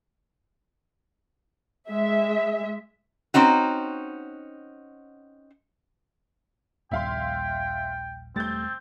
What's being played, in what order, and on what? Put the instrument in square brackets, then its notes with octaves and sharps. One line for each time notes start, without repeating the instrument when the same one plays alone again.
[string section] G#3 E5
[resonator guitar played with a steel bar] C4 C#4 D#4 F#4
[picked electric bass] A#1 D#2 G3 [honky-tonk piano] E5 F5 C6 [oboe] G5
[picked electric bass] E1 G3 A3 [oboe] C4 [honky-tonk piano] G6 A6